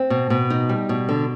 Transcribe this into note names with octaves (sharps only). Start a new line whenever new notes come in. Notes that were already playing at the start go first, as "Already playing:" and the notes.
Already playing: C4
B2
B2
D#4
G3
B2
D3